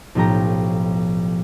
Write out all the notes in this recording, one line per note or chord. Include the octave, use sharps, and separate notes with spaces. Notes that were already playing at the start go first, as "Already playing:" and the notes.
B1 A2 F3 G4 A#5